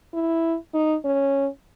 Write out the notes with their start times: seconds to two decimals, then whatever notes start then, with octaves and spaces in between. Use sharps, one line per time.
0.14 E4
0.74 D#4
1.05 C#4